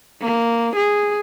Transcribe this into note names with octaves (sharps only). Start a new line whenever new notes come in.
A#3
G#4